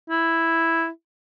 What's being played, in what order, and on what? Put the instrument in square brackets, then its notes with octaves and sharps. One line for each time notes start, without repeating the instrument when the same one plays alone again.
[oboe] E4